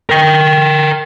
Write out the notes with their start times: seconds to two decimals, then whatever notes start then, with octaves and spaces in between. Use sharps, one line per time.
0.10 A#4 G5